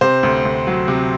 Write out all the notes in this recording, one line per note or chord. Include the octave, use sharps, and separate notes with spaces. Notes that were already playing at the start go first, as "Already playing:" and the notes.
C3 C5
D2
D2
F#3
C3